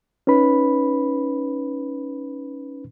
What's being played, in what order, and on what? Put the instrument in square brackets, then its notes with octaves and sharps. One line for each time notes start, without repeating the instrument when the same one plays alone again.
[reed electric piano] C#4 D#4 B4 B5